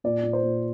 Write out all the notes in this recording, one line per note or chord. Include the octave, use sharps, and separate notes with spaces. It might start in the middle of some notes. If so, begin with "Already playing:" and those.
A#2 D5
A#2
C5
A#2